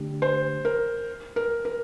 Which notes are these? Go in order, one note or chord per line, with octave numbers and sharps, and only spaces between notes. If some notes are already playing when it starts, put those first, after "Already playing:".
Already playing: D3 A3 D4 G4
C5
A#4
A#4
A#4